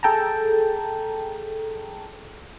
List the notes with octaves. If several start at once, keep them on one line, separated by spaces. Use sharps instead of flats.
G#4 A4 G5 A5 A#5